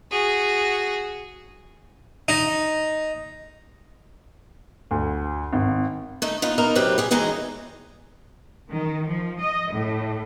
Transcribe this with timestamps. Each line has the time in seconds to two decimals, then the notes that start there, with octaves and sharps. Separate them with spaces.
0.11 F#4 G#4
2.28 D#4
4.91 D2
5.53 G#1
6.22 A3 D#4
6.42 B3 D#4 F4
6.58 A#3 D#4 A#4
6.75 F#2 C3 C4 G4 B4
6.98 G4 G#4
7.11 E2 E3 G#3 D#4 A#5
8.70 D#3
9.07 F3
9.40 D#5
9.71 A2